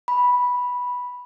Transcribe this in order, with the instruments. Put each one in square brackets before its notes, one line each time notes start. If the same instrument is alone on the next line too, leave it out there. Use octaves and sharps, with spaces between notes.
[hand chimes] B5